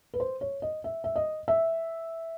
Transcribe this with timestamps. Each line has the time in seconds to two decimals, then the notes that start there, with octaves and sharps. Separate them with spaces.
0.14 B4
0.20 C5
0.41 C#5
0.62 D#5
0.84 E5
1.04 E5
1.16 D#5
1.48 E5